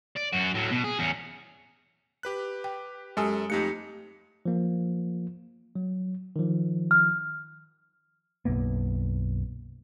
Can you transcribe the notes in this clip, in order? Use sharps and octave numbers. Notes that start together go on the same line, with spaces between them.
D5
F#2 F#4
A2 F#3
B2
G#4
E2 C#4
G4 B4 F#6
G5
F#2 G#3 G4 A4 G#5 D#6
F2 A3 D#4 G4 C#7
F3 A#3
F#3
D#3 F3
F6
B1 F#2 A#3 B3